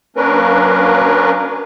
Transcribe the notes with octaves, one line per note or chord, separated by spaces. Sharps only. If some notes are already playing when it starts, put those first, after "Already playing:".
F#3 A#3 C#4 D4 A#4 B4